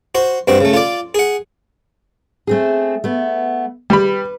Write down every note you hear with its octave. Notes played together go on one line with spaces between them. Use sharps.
F#4 C5
G2 C4 F#4
C#3 A3
F4 D5
G#4 F#5
A3 C4 G#4
A3 B3
G3 B4 B5